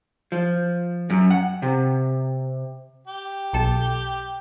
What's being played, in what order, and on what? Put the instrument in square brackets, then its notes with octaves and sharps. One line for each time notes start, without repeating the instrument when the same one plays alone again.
[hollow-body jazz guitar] F3
F#2
F#5
C3
[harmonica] G4
[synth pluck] B1 A4 E7